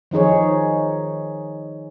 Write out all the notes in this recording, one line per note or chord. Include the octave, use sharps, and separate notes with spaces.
D#3 F3 D#4 G#4 C#5